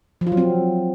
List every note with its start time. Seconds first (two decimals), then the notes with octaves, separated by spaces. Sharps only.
0.21 F3
0.27 F4
0.32 F#3
0.37 C4